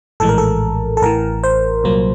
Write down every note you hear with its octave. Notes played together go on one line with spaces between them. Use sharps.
A#1 A2 E3 G#3 A4
A#4
A4
A4
A1 A2 E3 A#4
C5
C2 A#2 F#3 A#3